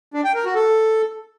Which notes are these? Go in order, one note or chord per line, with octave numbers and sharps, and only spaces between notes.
D4
G5
A#4
F#4
A4